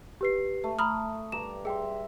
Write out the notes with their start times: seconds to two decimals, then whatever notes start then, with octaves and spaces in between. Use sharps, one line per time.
0.21 G4 B4 C7
0.64 A3
0.79 A#5 B5 D#6 F6
1.32 G2 A#5 D6 E7
1.65 G#4 E5 G5 C6